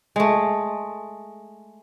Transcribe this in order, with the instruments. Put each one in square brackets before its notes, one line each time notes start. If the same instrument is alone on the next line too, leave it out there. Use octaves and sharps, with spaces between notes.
[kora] G#3 A3